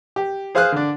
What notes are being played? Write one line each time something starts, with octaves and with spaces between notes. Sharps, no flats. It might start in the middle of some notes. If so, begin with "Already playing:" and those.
G4
G#4 C5 F5 D#6 F6 F#6
D3 D4